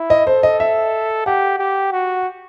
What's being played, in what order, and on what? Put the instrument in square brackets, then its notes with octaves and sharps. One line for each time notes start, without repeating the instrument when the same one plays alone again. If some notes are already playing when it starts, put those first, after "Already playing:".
Already playing: [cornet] E4
[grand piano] D#5
[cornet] A4 [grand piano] C5
[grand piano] D#5
E5
[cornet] G4 [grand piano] F#5
[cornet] G4
F#4